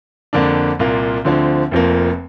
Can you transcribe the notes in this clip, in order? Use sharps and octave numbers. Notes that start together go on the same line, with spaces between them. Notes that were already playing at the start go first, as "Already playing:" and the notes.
F2 D3 A#3 D4
C2 A#2 A#3 F4
D2 D3 F3 C4
F1 F2 F3 A#3